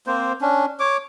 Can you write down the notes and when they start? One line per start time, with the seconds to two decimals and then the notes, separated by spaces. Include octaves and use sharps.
0.07 A#3 C4 C5
0.41 C#4 D4
0.80 C#5 D6